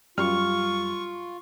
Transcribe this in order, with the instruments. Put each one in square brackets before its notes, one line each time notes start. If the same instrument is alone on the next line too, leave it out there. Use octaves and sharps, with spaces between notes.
[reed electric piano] F#2 G3 F6 [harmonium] F4 [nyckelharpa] C#6